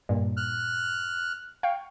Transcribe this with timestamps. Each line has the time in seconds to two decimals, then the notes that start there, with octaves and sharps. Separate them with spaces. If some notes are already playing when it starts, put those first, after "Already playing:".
0.09 G2 A#2
0.37 F6 F#6
1.63 F5 G5 C#6